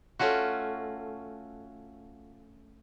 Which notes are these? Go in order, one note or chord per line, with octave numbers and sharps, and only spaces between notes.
A3 C#4 F4 F#4